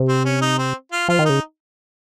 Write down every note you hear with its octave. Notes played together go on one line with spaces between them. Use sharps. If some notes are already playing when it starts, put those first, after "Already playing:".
Already playing: C3
C4
C#4
D#4
C4
F4
F3 F4
D#3
C#3 D#4